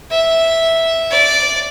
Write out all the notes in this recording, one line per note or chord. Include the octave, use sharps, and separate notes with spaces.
E5
D5